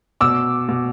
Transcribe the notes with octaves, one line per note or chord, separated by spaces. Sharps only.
B2 D6 E6
B2